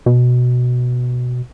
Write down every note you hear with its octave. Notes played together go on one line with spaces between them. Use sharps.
B2